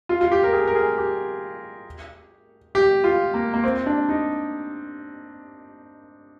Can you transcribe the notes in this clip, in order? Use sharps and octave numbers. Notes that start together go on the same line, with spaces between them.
F4
F4
G4
A#4
G#4
A#4
G#4
G4
G4
F4
A#3
A#3
C4
D4
D#4